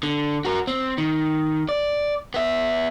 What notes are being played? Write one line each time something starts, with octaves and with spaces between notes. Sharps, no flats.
D3
F#4 A#4
C4
D#3
D5
B3 E5